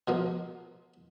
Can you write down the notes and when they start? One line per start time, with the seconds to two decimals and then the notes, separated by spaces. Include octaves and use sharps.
0.08 B2 F3 A#3